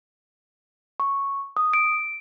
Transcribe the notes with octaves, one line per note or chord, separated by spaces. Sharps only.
C#6
D#6
D7